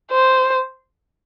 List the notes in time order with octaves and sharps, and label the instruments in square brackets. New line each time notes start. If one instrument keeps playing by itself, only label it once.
[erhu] C5